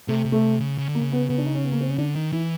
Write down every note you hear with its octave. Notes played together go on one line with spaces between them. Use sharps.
C3 A3
C3
A3
C#3
C#3
D3
A#3
C#3
B3
C#3 B3
D4
D#4
C#4
B3
A#3
C4
C#4
D3 D4
D#3 D#4
E3 E4